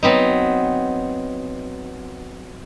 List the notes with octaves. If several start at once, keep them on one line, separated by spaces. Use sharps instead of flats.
F#3 B3 C4 D#4